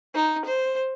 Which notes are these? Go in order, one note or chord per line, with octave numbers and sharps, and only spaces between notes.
D#4
C5